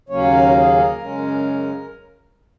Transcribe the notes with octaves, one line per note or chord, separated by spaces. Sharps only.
D#2 C#3 F#3 A#3 C#4 C#5
A#4
F#4
G#4
A#4
F#2 C#3 G#3 C#4